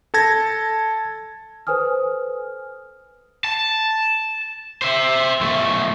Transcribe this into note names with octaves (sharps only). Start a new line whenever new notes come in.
A4 A5 G#6 A#6
A4 B4 C5 G#5 D#6 F6
A5
C5 E5
B1 A3